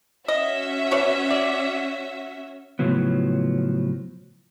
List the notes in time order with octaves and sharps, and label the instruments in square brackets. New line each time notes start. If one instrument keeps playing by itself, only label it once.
[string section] C#4 F#4 E5 [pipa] D#5
[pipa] B2 C#5 D5
D5
[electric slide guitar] A2 C#3 F3 F#3 B3